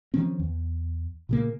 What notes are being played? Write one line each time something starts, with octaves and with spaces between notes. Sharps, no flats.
D#3 F3 C4 C#4
E2
A#2 C#3 A#3